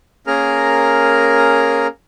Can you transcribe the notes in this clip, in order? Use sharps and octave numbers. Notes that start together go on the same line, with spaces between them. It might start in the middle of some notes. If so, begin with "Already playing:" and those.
A#3 C#4 G#4 A#4 A#5 F6